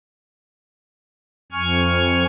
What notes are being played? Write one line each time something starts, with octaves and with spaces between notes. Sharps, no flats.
F2 G#5 C#6 F6